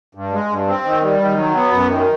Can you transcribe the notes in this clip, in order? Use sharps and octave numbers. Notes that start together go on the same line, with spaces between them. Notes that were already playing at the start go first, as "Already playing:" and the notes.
G2
G#3
G2
C4
D#3
G3
D#3
F#3
B3
F#2
D#3